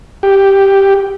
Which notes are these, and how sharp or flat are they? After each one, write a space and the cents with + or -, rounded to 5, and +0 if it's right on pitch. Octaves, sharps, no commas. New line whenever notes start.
G4 +0